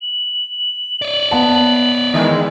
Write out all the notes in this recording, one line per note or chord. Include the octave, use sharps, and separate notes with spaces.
F#7
C#5 D5
B3 A5
D#3 E3 G#3